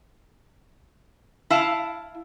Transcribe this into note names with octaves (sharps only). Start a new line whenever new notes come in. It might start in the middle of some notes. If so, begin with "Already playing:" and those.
E4 F5 A5